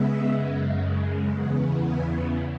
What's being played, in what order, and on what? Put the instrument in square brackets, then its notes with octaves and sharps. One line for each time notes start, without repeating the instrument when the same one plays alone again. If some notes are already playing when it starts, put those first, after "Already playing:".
Already playing: [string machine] C#3 G#3 B3 E5
F#2 C#3 G#3
E2 C#3 E3 B3 F#5
G#5